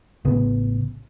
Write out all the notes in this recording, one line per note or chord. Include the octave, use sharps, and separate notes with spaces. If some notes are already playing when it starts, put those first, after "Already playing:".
A1 C#3 B3